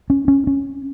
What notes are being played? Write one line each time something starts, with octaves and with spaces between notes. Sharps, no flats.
C#4
C#4
C#4